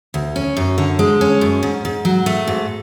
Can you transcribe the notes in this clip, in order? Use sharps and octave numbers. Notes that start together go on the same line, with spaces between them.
D2
C#4
F#2
D3
G#3
C#4
F#2
G#2
G#2
F#3
A3
G#2